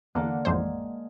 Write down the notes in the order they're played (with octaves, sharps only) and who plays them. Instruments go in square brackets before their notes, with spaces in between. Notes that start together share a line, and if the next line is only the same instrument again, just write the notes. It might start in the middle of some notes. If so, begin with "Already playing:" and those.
[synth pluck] E2 [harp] D3 A#3 F#5
[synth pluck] A1 F2 C5 [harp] G#3